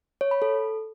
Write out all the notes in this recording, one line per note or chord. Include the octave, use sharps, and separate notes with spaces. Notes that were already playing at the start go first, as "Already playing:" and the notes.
C#5
B5
A4